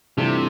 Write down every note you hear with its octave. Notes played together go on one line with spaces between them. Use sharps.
G2 C3 E3 A3 D4 F4